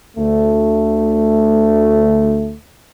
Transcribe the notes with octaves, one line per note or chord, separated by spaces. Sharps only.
D2 A3